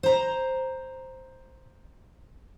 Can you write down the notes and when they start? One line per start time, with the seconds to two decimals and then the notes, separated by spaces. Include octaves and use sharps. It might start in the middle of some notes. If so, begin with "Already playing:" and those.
0.03 C5 A#5